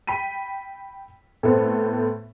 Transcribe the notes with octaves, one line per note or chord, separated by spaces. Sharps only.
G5 B5 B6 D#7
A2 A3 B3 C4